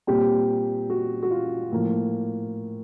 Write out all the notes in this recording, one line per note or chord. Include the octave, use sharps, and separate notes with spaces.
A#2 G3 C4 G4
F#4
F#4
F4
A2 F3 A#3